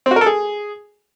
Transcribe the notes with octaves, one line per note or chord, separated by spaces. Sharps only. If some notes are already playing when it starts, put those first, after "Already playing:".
C4
F#4
A#4
A4
G#4